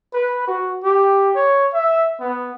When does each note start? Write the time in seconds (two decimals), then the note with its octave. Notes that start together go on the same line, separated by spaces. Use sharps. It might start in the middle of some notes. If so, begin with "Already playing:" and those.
0.13 B4
0.47 F#4
0.83 G4
1.35 C#5
1.73 E5
2.20 B3